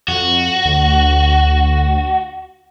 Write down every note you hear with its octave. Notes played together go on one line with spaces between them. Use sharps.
F2 F#4
D2